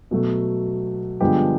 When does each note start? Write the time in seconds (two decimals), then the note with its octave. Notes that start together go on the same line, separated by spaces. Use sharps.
0.11 B2 F#3 A3
1.21 G2 D3 F3 G#3 B3 G4